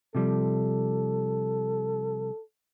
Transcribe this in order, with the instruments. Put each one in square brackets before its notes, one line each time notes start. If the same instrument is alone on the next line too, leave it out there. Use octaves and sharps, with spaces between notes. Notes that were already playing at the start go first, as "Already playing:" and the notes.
[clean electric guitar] C3 F3 G3 [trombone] A4